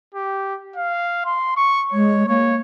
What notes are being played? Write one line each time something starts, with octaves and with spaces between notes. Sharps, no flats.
G4
F5
C6
C#6
G#3 C#5
A#3 C#5